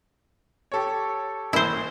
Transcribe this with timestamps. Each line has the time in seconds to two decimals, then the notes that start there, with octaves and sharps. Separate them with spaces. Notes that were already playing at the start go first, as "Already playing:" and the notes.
0.72 G4 A4 C#5
1.53 A1 A#3 E4 C5